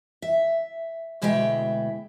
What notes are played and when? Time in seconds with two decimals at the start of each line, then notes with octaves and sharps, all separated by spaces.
0.22 E5
1.22 D2 B2 G#3 E4 E5 G5